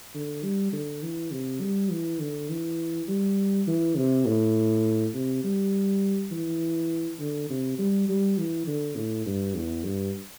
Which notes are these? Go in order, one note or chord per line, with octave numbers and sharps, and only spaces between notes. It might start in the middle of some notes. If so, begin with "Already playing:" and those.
D3
G3
D3
E3
C3
G3
E3
D3
E3
G3
E3
C3
A2
C3
G3
E3
D3
C3
G3
G3
E3
D3
A2
G2
E2
G2